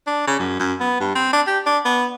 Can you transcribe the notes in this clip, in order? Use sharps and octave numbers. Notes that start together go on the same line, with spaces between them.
D4
C#3
F#2
F#2
B3
G2
C4
D4
G4
D4
B3